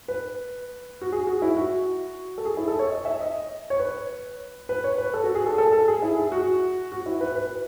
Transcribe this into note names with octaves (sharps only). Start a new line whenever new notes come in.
B4
F#4
G#4
F#4
E4
F#4
A4
G#4
E4
A4
C#5
D#5
E5
D#5
C#5
B4
B4
C#5
B4
A4
F#4
G#4
A4
A4
A4
G#4
E4
G#4
F#4
F#4
E4
B4
B4